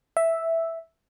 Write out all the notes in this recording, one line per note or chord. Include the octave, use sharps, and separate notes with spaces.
E5